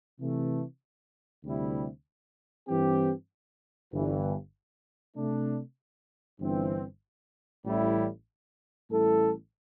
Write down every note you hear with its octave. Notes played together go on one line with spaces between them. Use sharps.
C3 E3 A3
D2 C3 G3 E4
G2 E3 C4 G4
G1 G2 E3
C3 A3 D4
G1 G2 E3 C4
A1 A2 G3 E4
A1 A2 G3 E4 A4